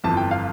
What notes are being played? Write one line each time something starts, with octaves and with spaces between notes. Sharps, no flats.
G1 F2 E3 A5
G5
F5